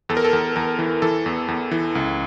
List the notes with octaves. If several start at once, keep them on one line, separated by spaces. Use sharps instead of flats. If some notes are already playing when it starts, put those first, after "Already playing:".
E2 A4
A#4
A4
E2
E2 A#4
E3
E3 A4
E2
E2
E3
C#2